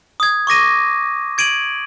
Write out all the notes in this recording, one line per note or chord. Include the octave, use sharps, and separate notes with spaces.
D#6 G#6
C#6 D6 A#6 D#7
G#6 D7 D#7 F#7